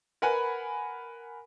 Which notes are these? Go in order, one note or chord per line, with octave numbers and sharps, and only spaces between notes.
A#4 B4 F#5 G#5 B5